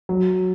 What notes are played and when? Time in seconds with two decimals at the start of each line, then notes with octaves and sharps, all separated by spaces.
0.09 F#3